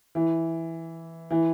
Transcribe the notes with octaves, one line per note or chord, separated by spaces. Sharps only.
E3
E3